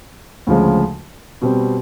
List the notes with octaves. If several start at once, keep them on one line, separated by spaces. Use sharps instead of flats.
D2 C#3 F3 G#3
B2 G3 C4